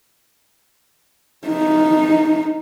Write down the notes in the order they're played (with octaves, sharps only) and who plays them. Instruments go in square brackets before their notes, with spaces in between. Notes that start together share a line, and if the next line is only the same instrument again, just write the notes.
[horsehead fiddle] D#4